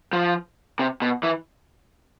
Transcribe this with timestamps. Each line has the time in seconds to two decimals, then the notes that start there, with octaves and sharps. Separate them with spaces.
0.13 F3
0.79 C3
1.02 B2
1.23 E3